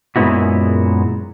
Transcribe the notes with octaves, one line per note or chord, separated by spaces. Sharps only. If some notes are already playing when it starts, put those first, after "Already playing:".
F#2 A#2 G#3 B3 E4 F#4